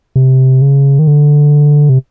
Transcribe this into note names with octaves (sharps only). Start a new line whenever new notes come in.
C3
C#3
D#3
D3
C3